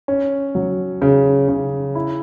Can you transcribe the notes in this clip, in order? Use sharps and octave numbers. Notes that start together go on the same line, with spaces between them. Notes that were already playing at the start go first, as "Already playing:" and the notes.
C#4
F#3
C#3
C#3
E4